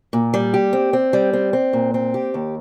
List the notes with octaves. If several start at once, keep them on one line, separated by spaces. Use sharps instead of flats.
A#2
G3
G4
C4
C4
G3
C4
C4
A#2
C4
G4
D#2